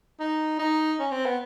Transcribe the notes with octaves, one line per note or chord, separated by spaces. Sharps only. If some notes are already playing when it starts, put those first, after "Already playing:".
D#4
D#4
C#4
C4
B3